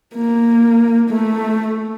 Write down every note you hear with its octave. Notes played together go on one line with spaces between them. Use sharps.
A#3
A3